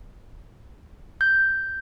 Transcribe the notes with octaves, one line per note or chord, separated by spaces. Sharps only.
G6